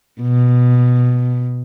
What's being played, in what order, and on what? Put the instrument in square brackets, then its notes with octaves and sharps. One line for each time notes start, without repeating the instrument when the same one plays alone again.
[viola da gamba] B2